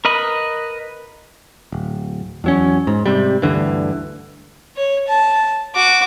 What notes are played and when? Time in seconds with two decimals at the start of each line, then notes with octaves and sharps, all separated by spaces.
0.05 A#4 B4 D#5 B5
1.72 D1
2.44 E2 F#3 C#4
2.87 G#2
3.06 G#2 C3 G3
3.42 D2 G2 D3 E3
4.76 C#5
5.08 A5
5.75 F#4 D6